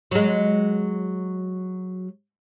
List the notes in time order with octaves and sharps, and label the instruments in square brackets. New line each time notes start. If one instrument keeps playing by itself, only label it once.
[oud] F#3 G#3